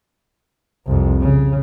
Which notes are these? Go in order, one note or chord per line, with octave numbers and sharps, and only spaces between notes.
C2 F2
C#3